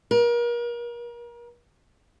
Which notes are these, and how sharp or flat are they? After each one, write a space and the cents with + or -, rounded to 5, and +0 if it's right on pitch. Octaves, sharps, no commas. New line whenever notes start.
A#4 +35